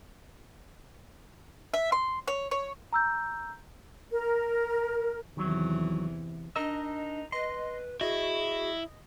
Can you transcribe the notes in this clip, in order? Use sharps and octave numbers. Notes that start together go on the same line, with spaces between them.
E5
C6
C#5
C#5
A#5 E6 G6
A#4
E2 C3 D#3 E3 F#3
D4 D#4 A#4 D#5 E6
B4 D#5 C6
E4 F#4 G#4 D#5